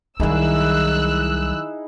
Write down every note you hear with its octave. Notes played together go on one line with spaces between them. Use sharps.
C2 D#3 F#3 D#4 E4 G#4 E6 F#6